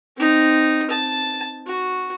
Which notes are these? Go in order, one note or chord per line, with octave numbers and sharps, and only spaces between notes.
C4 D#4
A5
F#4